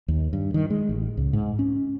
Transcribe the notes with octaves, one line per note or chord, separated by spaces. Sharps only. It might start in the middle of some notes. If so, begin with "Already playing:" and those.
D#2
G2
D#3
G#3
A1
C#2
G#2
C#4